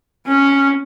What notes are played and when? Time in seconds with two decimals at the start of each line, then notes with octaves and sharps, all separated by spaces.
0.27 C#4